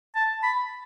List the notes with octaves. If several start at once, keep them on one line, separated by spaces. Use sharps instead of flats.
A5
B5